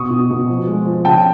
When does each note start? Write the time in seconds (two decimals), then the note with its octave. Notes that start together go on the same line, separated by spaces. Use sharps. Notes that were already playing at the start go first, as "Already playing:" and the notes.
Already playing: B2 C#6 D#6
0.11 B2
0.31 B2
0.49 F3
0.67 G#3
0.86 F3
1.05 C#3 G5 A5